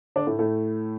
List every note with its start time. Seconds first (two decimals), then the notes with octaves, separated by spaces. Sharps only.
0.16 D3 D4
0.27 A2 A3
0.39 A2 A3